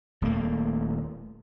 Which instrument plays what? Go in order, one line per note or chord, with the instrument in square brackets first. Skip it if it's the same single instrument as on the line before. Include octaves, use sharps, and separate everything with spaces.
[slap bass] D#1 A3 A#3